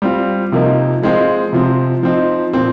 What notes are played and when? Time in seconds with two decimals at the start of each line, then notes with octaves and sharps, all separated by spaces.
0.02 G3 C4 F4
0.52 C3 F3 A#3 D#4
1.02 F3 G#3 C4 F4
1.53 C3 F3 C4
2.03 F3 C4 D#4
2.53 A#2 F3 C4